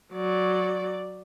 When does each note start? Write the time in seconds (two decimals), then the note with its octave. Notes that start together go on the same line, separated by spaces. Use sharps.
0.13 F#3 D5